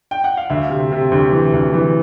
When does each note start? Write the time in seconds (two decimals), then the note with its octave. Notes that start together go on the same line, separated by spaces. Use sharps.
0.11 G5
0.24 F#5
0.37 F5
0.50 D2 E5
0.70 C3
0.92 C3
1.11 D2
1.32 E3
1.53 D2
1.74 E3